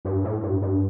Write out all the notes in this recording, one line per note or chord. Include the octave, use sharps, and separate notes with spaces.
G2
A2
G2
G2